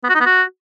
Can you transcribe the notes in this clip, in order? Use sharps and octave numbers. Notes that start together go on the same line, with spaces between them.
B3
F#4
D#4
B3
F#4